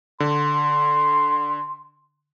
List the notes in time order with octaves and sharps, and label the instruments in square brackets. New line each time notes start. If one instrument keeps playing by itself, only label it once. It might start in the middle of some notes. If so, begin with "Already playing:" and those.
[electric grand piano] D3 [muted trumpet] C6